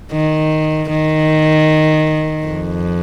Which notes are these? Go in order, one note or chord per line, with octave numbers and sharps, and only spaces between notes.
D#3
D#3
F2